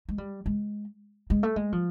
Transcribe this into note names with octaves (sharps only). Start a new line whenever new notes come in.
G#3
G3
G#3
G#3
A3
G#3
F3